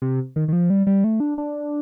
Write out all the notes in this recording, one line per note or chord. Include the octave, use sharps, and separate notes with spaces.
C3
D#3
D#3
F3
G3
G3
A3
D4
D4